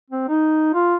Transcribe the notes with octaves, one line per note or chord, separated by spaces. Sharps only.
C4
D#4
F4